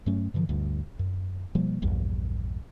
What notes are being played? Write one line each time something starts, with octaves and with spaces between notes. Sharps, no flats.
G2 F#3 A3 C#4
G2 D3 E3 F3
D2 G2
F#2
B2 F3 G3 A#3
A#1 E2 G2